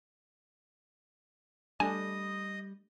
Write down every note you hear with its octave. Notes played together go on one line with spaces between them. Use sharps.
G3 A3 D4 D#5 G#5 D#6